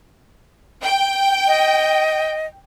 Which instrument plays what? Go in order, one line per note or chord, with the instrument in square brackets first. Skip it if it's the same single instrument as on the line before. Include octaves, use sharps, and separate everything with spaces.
[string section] G5
[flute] D#5